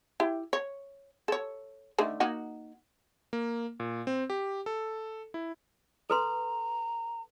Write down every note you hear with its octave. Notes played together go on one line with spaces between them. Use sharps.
E4 G4
C#5
A4 C#5
D3 D#3 A3
A#3 D#4 F#4
A#3
A#2
C4
G4
A4
E4
A4 B4 A#5 C6